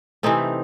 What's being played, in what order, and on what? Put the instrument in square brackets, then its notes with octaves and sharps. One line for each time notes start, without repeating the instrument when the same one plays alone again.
[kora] C3 E3 A3 C4 D#4